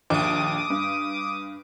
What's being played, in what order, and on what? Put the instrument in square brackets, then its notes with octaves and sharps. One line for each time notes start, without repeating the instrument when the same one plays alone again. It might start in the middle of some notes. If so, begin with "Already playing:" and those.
[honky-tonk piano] A#1 D#2 [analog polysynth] D6 D#6
[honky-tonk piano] G2